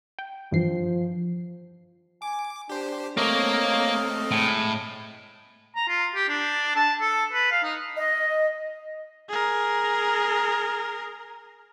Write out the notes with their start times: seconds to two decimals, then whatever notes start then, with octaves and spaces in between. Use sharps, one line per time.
0.19 G5
0.52 G2 E3 F3 C7
2.22 G#5 D6
2.70 D4 G4 C5
3.17 A3 A#3 C4 A4 A#4 C#5 D#5 F6
4.31 A2 G#3
5.76 A#5
5.88 F4
6.15 G4
6.29 D4
6.75 A5
7.01 A4
7.33 B4
7.51 F5
7.63 D#4
7.97 D#5
9.29 G#4 A#4